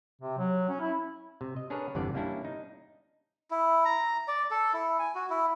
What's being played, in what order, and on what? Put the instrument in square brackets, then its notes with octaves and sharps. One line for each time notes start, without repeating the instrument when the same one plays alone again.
[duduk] C3
F#3
C#4
E4
[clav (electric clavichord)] C3
D#5
C#4 D4 G#4 A#4 B4 C#5
G1 E2 C3 E3 D4 D5
G3 A#3 C#4 D4 E4
D#4
[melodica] E4
A#5
D5
A4
E4
G#5
F#4
E4